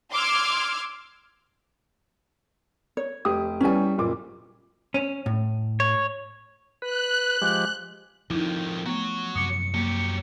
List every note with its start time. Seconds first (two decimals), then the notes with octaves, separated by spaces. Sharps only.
0.12 C6 D6 E6 F6 G#6
2.97 C#5
3.25 F1 G4 D#6
3.61 E2 G3 C#4 G#5
3.98 F#1 A#2 D6
4.94 C#4
5.26 A2
5.80 C#5
6.82 B4 F#6
7.42 F3 G#3 G4
8.30 F2 D#3 F3 D#4 E4
8.86 A3 B3 F#4 C#5
9.35 F#2 C3 F3 D6 D#6 C#7
9.74 F#3 A#3 G4